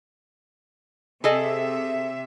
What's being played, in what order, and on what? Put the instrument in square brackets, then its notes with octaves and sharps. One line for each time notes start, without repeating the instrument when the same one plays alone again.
[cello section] C3 E5 [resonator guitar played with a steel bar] G#4 A4 D#5